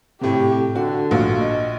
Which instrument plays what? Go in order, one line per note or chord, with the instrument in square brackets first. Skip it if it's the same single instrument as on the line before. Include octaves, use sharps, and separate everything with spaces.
[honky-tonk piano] A2 C3 [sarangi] G4
[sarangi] D3 [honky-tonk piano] F#4
[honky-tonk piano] A#1 F#4 F5
[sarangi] D#5